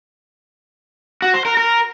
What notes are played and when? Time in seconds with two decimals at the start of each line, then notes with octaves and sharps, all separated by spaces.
1.22 F#4
1.34 C5
1.45 A#4
1.57 A#4